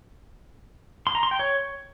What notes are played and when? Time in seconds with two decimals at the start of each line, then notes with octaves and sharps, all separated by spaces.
1.07 C6
1.15 A#5
1.23 C6
1.31 G5
1.40 C#5